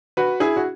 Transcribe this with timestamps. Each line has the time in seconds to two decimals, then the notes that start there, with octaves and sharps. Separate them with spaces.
0.17 F#4 B4
0.40 E4 G#4
0.56 F#4